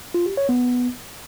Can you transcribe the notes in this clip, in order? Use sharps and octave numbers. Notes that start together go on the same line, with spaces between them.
F4
G4
C#5
B3